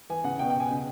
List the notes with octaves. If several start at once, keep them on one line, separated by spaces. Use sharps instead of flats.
E3 G#5
C#3 F#5
B2 G5
G5
B2 G#5
C#3